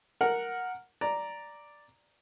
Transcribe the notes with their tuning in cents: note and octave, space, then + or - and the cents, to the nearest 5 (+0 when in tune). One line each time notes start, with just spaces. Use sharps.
A#4 +0 F#5 -10
D5 +0 A#5 +0